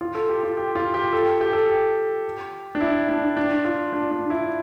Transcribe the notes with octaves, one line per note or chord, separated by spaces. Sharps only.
F4
A4
G4
F4
G4
F4
G4
A4
G4
A4
G4
D4
E4
D4
D4
F4
D4
D4
E4